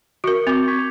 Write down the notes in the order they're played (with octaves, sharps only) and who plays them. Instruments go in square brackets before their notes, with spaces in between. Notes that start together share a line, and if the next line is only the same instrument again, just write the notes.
[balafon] F#4 A#4 [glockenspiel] C#6 C#7
[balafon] C4 [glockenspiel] D6 G6 F7
[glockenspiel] C#6 G#6 B6